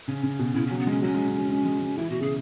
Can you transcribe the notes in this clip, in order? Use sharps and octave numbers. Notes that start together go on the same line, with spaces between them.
C#3 C#4
C#3
B2
C#3 E4
F#3 C#4
B3
G#3 C#4
F#3 C#4
G#3
C#3
F#3
G#3
G#3
G#3
E3 E4
B2 F#4
C#3 G#4